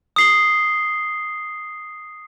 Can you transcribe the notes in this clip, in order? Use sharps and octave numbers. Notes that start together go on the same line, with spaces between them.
D#6 C7 G7